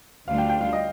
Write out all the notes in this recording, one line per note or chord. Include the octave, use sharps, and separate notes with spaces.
D2 D3 G3 D4 F4 F5
G5
G5
F5
D#5